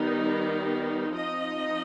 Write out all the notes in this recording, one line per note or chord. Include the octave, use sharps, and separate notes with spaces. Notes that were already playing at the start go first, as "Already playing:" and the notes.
Already playing: D#3 G3 B3 D#4
F3 C4 D#4 D#5